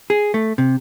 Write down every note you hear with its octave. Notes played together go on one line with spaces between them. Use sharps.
G#4
A3
C3